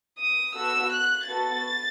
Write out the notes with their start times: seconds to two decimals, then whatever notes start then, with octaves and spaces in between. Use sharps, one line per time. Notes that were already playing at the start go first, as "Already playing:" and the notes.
0.18 D#6
0.55 B3 F#4 A4 E6
0.92 F#6
1.28 B3 F#4 A4 A6